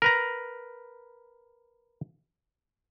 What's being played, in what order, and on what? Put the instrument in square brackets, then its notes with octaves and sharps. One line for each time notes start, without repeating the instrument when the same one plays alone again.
[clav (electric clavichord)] A#4 B4 A#5